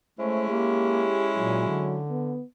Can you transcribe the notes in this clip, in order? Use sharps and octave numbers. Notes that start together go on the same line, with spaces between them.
G#3 A3 C#4 E4 C5
A#3 G4
A#2 F#3
D3
B3